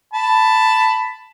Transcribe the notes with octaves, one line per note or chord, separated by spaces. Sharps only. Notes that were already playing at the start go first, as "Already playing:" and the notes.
A5 B5